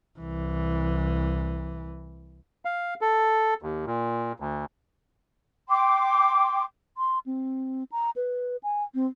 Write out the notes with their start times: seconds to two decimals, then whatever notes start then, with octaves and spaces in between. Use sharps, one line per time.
0.19 C2 E3
2.65 F5
3.01 A4
3.62 D#2
3.87 A#2
4.40 D2
5.69 G5 C6 D6
6.98 C6
7.26 C4
7.92 A#5
8.16 B4
8.63 G#5
8.94 C4